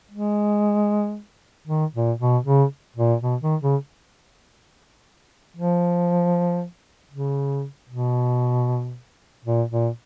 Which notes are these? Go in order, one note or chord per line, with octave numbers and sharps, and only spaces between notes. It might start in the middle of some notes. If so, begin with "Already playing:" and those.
G#3
D#3
A#2
B2
C#3
A#2
B2
D#3
C#3
F3
C#3
B2
A#2
A#2